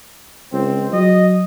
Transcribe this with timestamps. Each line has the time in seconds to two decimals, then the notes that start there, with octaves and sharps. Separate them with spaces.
0.53 C#2 C4
0.92 F#3 D#5